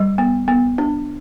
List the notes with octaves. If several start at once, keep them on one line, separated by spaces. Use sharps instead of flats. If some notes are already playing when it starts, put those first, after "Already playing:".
Already playing: G3
B3
B3
D4